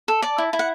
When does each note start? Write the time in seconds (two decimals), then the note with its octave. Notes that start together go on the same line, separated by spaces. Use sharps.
0.08 A4
0.22 D5 A5
0.38 E4
0.53 E4
0.59 F#5